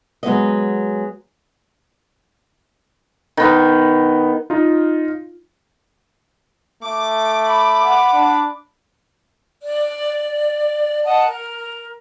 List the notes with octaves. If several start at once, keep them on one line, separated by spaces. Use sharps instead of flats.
F#3 G#3 B3 D#5
D#3 B3
D#4 F4
A3 D6
B5 D6
F#5
D4
D5
D#5 F#5 A5
A#4